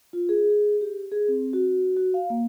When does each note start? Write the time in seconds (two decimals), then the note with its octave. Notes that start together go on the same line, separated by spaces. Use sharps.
0.13 F4
0.29 G#4
0.50 G#4
0.81 G4
1.12 G#4
1.28 C4
1.53 F#4
1.97 F#4
2.14 F5
2.30 A#3